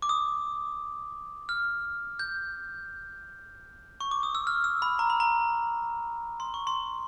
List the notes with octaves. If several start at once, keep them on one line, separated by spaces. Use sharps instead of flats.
D6
D#6
F6
G6
C#6
D6
D#6
E6
F6
E6
B5
A#5
B5
A#5
C6
C#6
C6